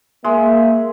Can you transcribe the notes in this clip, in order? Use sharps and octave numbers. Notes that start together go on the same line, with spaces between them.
G#3 A#3 E5